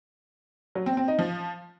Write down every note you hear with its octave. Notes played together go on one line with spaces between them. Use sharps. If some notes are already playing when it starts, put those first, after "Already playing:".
F#3
C4
C4
D#4
F3